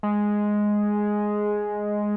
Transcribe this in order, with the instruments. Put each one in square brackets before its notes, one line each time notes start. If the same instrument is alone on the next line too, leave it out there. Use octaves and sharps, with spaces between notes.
[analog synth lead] G#3